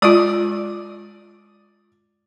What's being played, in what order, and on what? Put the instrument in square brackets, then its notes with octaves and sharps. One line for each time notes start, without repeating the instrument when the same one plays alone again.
[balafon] G#3 F4 [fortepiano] D5 D#6